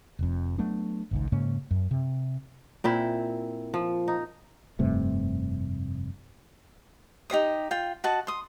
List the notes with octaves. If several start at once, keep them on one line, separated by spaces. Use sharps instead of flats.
F1 F2
F#3 A3 B3 D4
G#1 C#2 G#2
G#2 C#3 A#3 C#4
F#2
C3
A#2 C4 E4
F3
D#4
F1 G2 C3 A3
D#4 G4 C5 D#6
F4 G5
F#4 D#5 F#5 A5
C6 D#6